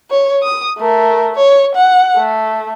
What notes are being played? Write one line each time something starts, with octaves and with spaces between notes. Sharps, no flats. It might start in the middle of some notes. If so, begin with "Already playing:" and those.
C#5
D#6
A3 A#4
C#5
F#5
A3